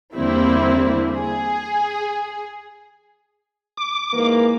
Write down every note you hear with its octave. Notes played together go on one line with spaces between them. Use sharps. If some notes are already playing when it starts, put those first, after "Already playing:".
E2 D3 G3 A#3 C4 E4
G#4
D6
G#2 E3 A#3